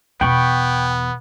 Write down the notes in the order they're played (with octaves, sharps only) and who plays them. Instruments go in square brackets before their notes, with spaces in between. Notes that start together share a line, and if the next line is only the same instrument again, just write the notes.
[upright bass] E2 B2 [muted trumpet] B3 [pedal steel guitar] G5 B5 C#6